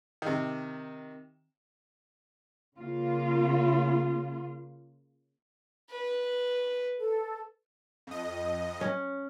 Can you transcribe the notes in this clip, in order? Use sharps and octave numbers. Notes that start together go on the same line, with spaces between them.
C3 D#3
C#3 A#3 F4
B4
A4
F2 D#5
C#4